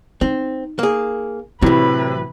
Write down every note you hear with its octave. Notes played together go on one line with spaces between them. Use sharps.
C4 D#4
A#3 G#4
A2 C3 E3 F#3 E4 B4